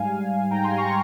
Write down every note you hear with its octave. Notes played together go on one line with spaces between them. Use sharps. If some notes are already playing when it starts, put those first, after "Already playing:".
Already playing: G#2 G3 F5 G#5
G#2
G3
G#2 G5 A#5
G#5 C6
G3
A#5 C#6